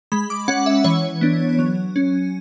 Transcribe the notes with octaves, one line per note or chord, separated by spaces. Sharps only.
G#3 B5
D6
C#4 F#5
E5
E3 C#5
B3 D4
F#3
C#4